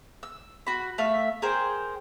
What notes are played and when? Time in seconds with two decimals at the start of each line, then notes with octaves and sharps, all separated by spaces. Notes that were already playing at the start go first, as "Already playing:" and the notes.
0.23 E6
0.67 F#4 B5
0.98 A3 E5 F5
1.42 G#4 A#4 C5 G5